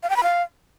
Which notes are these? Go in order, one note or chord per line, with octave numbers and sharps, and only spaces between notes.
F5
G5
B5
F5